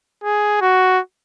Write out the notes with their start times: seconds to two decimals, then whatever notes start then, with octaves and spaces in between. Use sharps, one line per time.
0.24 G#4
0.61 F#4